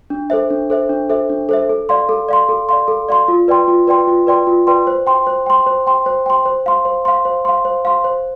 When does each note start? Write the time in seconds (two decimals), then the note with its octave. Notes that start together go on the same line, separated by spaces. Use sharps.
0.10 D4
0.30 A4 C5 E5
0.50 D4
0.70 A4 C5 E5
0.89 D4
1.09 A4 C5 E5
1.29 D4
1.49 A4 C5 E5
1.69 A4
1.89 D5 F5 C6
2.09 A4
2.29 D5 F5 C6
2.49 A4
2.69 D5 F5 C6
2.88 A4
3.09 D5 F5 C6
3.28 F4
3.48 B4 D5 G5 C6
3.68 F4
3.87 B4 D5 G5 C6
4.07 F4
4.27 B4 D5 G5 C6
4.47 F4
4.67 B4 D5 G5 C6
4.87 C5
5.07 G5 C6
5.27 C5
5.46 G5 C6
5.66 C5
5.87 G5 C6
6.06 C5
6.26 G5 C6
6.45 C5
6.66 F5 C6
6.85 C5
7.05 F5 C6
7.25 C5
7.45 F5 C6
7.65 C5
7.85 F5 C6
8.04 C5